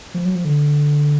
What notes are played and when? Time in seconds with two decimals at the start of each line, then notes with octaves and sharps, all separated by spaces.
0.14 F3
0.25 F#3
0.35 F3
0.45 D3